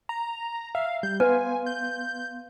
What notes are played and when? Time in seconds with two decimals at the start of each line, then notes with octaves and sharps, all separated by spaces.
0.09 A#5
0.75 E5 F5
1.03 G3 G6
1.20 B3 B4 F5 G#5 C6
1.66 G6